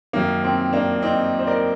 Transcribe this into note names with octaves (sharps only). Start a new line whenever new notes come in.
F#2 D#3 A#3
C4
A#3 D4
C4 D#4
C5
A#4 D5